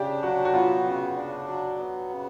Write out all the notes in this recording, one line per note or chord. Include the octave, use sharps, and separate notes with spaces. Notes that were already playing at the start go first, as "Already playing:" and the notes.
Already playing: C#3 D4 G4
F#3 F#4
F#4
B3 F4
C#3
D4
F#3
B3
C#3